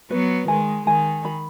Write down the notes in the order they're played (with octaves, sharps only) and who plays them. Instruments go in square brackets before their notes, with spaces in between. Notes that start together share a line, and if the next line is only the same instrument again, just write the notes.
[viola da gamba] F#3 B3 [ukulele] B4
[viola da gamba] D#3 G#3 [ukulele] G#5
[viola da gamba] D#3 [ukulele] G#5
[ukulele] B5